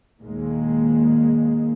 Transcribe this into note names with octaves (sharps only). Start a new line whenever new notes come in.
D#2 A#2 G#3 A#3